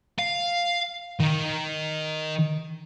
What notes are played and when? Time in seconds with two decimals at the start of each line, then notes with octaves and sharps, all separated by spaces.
0.18 F5
1.20 D#3